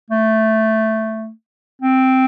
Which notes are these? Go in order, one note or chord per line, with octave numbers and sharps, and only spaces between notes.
A3
C4